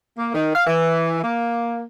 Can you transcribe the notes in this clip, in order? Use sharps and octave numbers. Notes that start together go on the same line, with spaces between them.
A#3
D#3
F5
E3
A#3